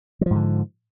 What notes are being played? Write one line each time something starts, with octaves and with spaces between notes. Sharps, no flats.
G#2 D3 F3 F#3